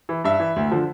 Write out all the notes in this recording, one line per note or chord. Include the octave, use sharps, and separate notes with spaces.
E3
G2 E5
E3
D2
D3 F3